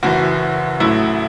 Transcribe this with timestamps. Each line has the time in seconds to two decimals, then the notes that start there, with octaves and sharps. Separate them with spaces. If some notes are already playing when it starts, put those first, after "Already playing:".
0.03 F#1 F#2 E3 F#4
0.80 A1 A2 F#3 A3 E4